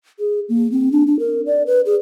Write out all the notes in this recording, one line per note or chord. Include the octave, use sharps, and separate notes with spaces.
G#4
A#3
C4
D4
D4
A#4
D5
B4
G#4